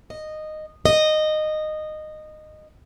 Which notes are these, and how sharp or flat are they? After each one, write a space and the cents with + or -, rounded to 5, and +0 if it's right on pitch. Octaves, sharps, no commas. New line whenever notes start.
D#5 -10
D#5 -15